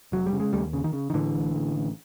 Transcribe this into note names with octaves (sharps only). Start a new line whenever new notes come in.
F1 F#3
G3
C#3
G#3
D#2 G3 A3
C#3
D#3
C#3
D#3
A2 D3 E3
A1
A1
A1